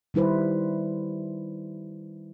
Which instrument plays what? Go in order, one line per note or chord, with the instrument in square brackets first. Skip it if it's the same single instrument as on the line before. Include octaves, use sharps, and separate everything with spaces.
[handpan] D#3 G3 E4 B4 C5